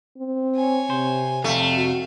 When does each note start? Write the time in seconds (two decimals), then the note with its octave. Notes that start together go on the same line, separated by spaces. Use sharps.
0.18 C4
0.55 C#5 G#5
0.90 C3 C5
1.44 F2 C3 A3 F5
1.74 F#4